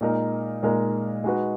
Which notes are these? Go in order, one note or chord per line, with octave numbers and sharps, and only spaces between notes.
A#2 G#3 D#4 A#4
A#2 G#3 D#4 A#4
G#3 D#4 F#4 B4